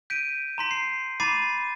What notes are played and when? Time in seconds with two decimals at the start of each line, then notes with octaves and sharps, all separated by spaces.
0.10 G6 B6 D7 D#7
0.58 A#5 C6 B6
0.71 C7
1.20 A#5 B5 D6 A6 C7 D#7